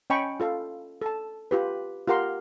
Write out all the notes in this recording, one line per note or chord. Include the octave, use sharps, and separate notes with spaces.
C#4 D#5 G5 G#5 B5 C#6
F4 A4 F5
A4 A5
F4 G4 B4
F4 G4 A#4 F#5 C6